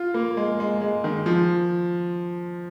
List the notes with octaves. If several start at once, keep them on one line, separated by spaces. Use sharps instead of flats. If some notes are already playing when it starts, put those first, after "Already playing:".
Already playing: F4
A#3
G#3
G#3
G#3
D#3
F3